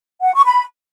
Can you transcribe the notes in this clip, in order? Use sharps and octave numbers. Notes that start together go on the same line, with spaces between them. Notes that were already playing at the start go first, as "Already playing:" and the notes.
F#5
C#6
B5